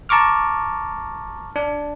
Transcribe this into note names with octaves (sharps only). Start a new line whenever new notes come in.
A5 A#5 C#6 D6 F6
D4